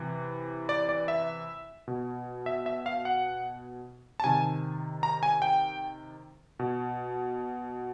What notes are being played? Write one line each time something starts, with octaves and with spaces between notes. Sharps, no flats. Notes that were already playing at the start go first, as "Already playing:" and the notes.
Already playing: C3 E3
D5
D5
E5
B2
E5
E5
F5
F#5
A5
C3 D#3 G#5
A#5
G#5
G5
B2